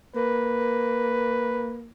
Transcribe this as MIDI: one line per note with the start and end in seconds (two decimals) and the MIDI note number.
0.16 1.90 58
0.16 1.80 71